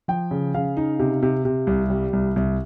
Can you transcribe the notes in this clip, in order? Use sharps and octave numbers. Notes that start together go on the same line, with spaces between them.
F3 G5
C#3
C#3 F5
D#4
C3
C3
C3
C2
G3
C2
C2